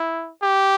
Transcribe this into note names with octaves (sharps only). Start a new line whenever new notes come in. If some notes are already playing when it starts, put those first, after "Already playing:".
Already playing: E4
G4